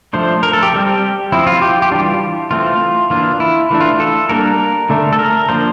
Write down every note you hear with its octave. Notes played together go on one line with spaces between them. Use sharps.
F3 A3 D4 C5
A#4
A4
G4
G3 C4
F3 C4 E4
F4
G4
G4
E3 G3 D4 F4
E3 A3 C4 F4
E3 A#3 D4 F4
E4
E3 A3 D4
F4
A4
G3 A#3 D4 A#4
D3 A3 D4
A4
A#4
F3 A#3 D4 C5